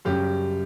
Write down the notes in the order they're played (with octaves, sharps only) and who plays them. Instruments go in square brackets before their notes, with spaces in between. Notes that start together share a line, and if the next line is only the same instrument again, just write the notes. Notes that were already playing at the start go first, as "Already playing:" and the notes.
[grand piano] F#2 C#3 G3 G4